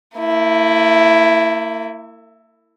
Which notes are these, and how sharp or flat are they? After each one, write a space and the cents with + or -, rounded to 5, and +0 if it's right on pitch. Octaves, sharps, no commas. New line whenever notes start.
A#3 -45 E4 +5